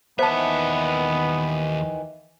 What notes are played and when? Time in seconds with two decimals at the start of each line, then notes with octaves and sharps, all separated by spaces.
0.19 D#2 D#3 E3 B3 C5 E5 A5